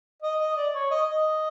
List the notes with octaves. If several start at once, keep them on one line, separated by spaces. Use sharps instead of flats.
D#5
D#5
D5
C#5
D#5
D#5